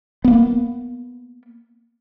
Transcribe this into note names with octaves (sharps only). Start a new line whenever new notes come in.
A#3 B3